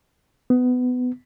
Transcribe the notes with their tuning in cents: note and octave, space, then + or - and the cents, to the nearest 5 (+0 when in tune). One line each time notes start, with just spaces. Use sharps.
B3 +20